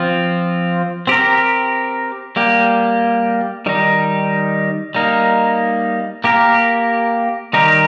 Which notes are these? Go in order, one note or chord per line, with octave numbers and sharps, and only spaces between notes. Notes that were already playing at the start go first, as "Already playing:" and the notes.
Already playing: F3 C4 F4
C4 G4 A#4
G3 A#3 G4
D#3 G3 D#4
G3 A#3 D#4 A#4
A#3 G4 A#4
D#3 G3 D#4 G4 A#4